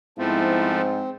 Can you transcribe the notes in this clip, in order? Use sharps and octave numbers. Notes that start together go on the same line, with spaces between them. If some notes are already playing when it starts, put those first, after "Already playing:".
G#2 F3 A3 B3 C4 E4